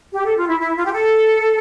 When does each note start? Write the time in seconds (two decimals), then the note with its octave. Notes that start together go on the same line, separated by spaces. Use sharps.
0.13 G4
0.24 A4
0.37 F4
0.47 E4
0.60 E4
0.75 F4
0.85 G4
0.92 A4